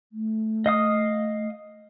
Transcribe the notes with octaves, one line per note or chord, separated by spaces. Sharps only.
A3
D#5 F5 D#6